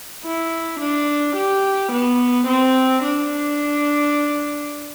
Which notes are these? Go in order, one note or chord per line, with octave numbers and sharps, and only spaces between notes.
E4
D4
G4
B3
C4
D4